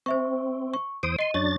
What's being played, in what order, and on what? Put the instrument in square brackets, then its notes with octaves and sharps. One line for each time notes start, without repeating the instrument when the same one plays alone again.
[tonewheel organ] C4 [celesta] C5 E5 C#6
[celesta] C#6
[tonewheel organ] E2 C5 D#6 [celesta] D7
[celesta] D#5 D#7 [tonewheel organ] C6
[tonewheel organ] F#2 D4 A6 [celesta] C#5 C#6